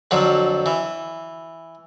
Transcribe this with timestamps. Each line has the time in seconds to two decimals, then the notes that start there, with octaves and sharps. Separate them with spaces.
0.11 F2 D3 F3 F#3
0.66 E3